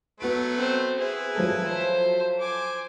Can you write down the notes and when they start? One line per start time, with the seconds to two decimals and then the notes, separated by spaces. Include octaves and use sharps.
0.20 F#3 A3 B3 F#4 B4 D7
0.57 C4 C5
0.99 E4 G#4 B4
1.35 F3 F#3 A4
1.66 C5
2.39 C5 G#5 D6